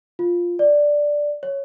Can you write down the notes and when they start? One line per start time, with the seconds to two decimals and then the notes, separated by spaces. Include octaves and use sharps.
0.19 F4
0.59 D5
1.43 C#5